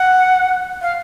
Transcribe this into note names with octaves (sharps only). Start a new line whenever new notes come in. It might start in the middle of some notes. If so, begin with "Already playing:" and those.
Already playing: F#5
F5